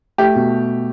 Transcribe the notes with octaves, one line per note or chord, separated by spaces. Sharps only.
A3 G4
B2